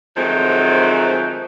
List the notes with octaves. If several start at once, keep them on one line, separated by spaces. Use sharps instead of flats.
D#3 F3 F#3 G#3 A3 C4